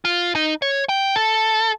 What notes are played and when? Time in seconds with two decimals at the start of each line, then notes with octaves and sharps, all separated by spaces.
0.05 F4
0.35 D#4
0.62 C#5
0.89 G5
1.16 A4